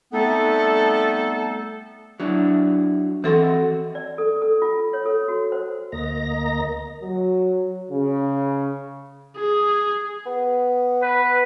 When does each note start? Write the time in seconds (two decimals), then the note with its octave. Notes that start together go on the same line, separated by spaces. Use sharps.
0.13 G3 A3 B3 C4 D#4 A4
2.20 F#3 D4 E4
3.24 E3 C4 F#4 A4 C6
3.95 D5
4.18 A4
4.42 A4
4.62 F4
4.93 C#5
5.06 A4
5.28 F#4
5.52 C5
5.92 D2 A#3 D#5 A#5 A#6
7.03 F#3
7.91 C#3
9.37 G#4
10.26 B3
11.02 B4